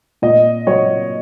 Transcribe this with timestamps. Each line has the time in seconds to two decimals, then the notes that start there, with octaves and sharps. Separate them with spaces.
0.22 A#2 D#5
0.67 F#3 C#5